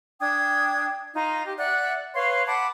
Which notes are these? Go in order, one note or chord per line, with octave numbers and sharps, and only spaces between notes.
D4 G5 D#6 G#6
D#4 F4 A#5
G4
D5 E5 F#5 F#6
B4 C#5 F5 C6
F#5 A5 B5 D6